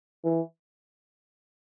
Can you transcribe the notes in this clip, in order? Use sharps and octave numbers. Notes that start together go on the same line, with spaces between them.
E3